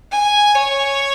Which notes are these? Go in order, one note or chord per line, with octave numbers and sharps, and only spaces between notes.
G#5
C#5